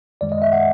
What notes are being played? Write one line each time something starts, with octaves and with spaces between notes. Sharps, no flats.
F#2 D#3 G#3 D5
D#5
E5
F#5